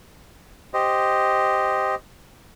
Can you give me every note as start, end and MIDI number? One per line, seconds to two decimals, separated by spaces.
0.74 1.95 67
0.74 1.95 72
0.74 1.95 75